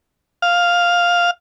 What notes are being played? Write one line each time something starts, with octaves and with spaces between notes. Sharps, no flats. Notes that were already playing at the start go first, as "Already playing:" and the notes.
F5